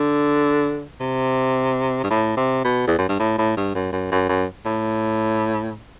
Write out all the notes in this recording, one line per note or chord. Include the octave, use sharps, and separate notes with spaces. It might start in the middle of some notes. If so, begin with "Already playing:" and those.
Already playing: D3
C3
G2
A2
C3
B2
E2
F#2
G2
A2
A2
G2
F#2
F#2
F#2
F#2
A2